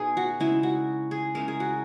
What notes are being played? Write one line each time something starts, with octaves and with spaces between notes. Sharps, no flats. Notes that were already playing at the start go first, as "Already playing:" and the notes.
Already playing: B2 D#4 G#4
F#4
C#3 G#3 D#4 E4
F#4
G#4
C#3 G#3 C#4 E4 A#4
G#4
F#4